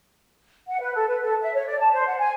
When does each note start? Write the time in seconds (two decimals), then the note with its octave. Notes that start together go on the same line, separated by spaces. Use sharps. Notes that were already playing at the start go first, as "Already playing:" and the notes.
0.68 F#5
0.80 B4
0.93 A4
1.08 B4
1.21 A4
1.41 E5
1.53 C#5
1.67 D5
1.78 A5
1.92 C5
2.06 F#5
2.18 G#5